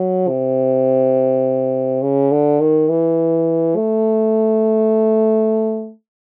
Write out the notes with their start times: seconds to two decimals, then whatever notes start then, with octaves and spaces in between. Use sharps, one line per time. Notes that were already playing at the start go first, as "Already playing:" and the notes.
Already playing: F#3
0.28 C3
2.02 C#3
2.32 D3
2.61 D#3
2.89 E3
3.76 A3